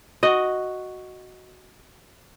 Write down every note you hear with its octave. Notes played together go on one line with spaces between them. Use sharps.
F#4 D#5